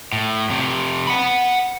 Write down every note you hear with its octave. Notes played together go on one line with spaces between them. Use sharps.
A2
F2 C3
F#5 B5